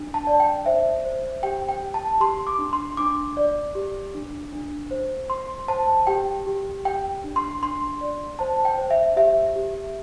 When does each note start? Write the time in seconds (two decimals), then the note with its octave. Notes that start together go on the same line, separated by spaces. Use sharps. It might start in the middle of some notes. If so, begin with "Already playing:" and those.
Already playing: D4
0.14 A5
0.27 D5
0.40 G5
0.66 C5 E5
1.05 C5
1.43 G4 G5
1.69 G5
1.83 G4
1.94 A5
2.20 G4 C6
2.47 D6
2.59 D4
2.73 C6
2.97 D4 D6
3.37 D5
3.75 G4
4.15 D4
4.52 D4
4.91 C5
5.29 C5 C6
5.68 C5 A5
6.07 G4 G5
6.47 G4
6.85 G4 G5
7.24 D4
7.36 C6
7.63 D4 C6
8.01 D5
8.39 C5 A5
8.65 G5
8.78 C5
8.90 E5
9.16 G4 E5
9.56 G4